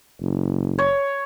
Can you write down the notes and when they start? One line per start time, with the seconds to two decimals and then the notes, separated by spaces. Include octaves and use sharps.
0.21 F#1
0.78 C#5